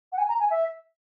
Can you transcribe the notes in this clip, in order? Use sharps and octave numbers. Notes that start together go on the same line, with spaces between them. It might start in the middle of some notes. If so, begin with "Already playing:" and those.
F#5
G#5
A#5
G#5
E5